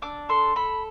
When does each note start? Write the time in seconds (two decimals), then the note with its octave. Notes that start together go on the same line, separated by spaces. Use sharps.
0.02 D4 D6
0.29 A4 C6
0.56 A4 B5